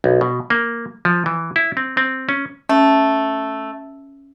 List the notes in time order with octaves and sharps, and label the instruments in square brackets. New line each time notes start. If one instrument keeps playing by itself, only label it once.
[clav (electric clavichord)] B1
B2
A#3
F3
E3
E4
C4
C4
C#4
[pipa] A3 [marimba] C#4